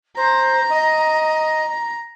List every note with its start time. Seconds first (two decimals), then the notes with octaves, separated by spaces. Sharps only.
0.17 C5 A#5
0.70 D#5